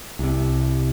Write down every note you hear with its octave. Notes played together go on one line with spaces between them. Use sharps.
C2 C3